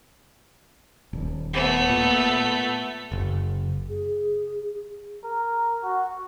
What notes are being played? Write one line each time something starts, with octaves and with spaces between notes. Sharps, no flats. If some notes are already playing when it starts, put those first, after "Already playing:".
D#1
A3 B3
A#2
F#1
G#4
A#4
F#4